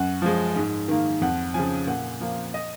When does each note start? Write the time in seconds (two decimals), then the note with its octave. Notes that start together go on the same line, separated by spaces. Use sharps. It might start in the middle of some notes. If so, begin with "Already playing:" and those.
Already playing: F#2 F#5
0.22 F3 G#3
0.56 G#2
0.88 D#3 A#3
1.22 F2 F#5
1.54 C#3 F3 G#5
1.87 A#2 F#5
2.21 F3 A#3
2.54 D#5